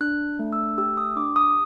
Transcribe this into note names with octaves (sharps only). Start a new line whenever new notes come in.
D4 F#6
A3
E6
G4 E6
D#6
D4 D6
D#6